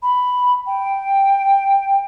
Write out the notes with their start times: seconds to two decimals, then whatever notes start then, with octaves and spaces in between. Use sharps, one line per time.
0.02 B5
0.66 G5